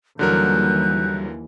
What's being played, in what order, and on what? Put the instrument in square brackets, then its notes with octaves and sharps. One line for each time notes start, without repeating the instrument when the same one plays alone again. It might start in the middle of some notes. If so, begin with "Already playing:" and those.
[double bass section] D#2 E3 [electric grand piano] D3 F#3 A#4 [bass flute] G3 [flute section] F#6 G6